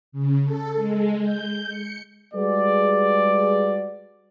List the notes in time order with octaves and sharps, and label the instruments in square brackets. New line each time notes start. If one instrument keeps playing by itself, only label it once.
[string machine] C#3
A4
G#3
G6
C#7
[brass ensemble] G3 G#3 F#4 G#4 B4 D5